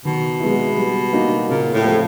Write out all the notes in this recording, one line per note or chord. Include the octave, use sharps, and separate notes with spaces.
B2 D#3
G#3 B3 E4
G3
A#3 D#4 F#4
A#2 C#3
A2
F3 A3 C4 F4